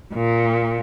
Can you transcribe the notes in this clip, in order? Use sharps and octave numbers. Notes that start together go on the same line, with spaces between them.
A#2